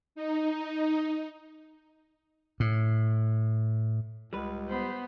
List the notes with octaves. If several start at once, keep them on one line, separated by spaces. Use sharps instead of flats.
D#4
A2
C#2 G3 B4
B3 C5 B5